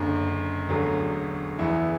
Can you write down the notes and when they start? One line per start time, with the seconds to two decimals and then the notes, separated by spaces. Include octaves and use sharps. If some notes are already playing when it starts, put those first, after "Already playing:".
Already playing: F#1 F#2 D3
0.68 E1 D2 D3 F#3
1.59 E1 E2 E3 B3 E4